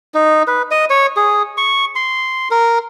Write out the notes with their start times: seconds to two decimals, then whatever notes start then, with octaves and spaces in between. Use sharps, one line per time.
0.14 D#4
0.47 B4
0.71 D#5
0.90 C#5
1.17 G#4
1.57 C#6
1.95 C6
2.51 A#4